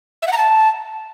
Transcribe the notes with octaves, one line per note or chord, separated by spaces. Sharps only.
E5
F#5
A#5
A5